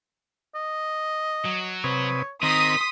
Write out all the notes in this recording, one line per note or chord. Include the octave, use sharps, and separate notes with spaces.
D#5
F#3
C3 B4 C#5 D#6
D#3 C4 A#4 D#5 A#5 C6 D#6 B6